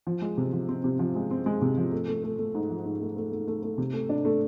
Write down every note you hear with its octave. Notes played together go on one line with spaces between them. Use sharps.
F3
G#3
C3
F3
C4
C3
F3
G#3
C4
G#3
C3
F3
A3
A3
A3
A3
G#2
F3
G#2
A3
A3
A3
A3
A3
C3
A3
D4
A3